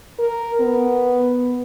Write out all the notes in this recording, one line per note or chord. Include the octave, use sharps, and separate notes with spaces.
A#4
B3